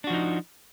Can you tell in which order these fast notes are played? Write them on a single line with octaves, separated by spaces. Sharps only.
D4 F#4 F3 D#4